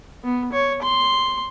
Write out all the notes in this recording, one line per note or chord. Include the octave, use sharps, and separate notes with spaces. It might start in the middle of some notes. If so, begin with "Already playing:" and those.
B3
C#5
C6